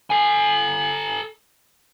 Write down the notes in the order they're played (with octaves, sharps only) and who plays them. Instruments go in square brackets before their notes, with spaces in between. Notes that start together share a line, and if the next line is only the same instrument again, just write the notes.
[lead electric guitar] A4 G#5